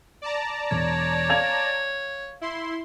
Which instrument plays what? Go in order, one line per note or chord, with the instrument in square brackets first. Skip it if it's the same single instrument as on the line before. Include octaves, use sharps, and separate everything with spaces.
[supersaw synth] D5 A5 A#5
[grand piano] E1 [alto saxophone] C#5
[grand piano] F5 G#6 F7
[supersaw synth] E4 C6